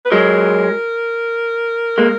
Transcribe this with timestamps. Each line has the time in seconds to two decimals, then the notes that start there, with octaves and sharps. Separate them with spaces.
0.06 B4
0.11 F#3 G#3 A#4
1.98 G#3 A#3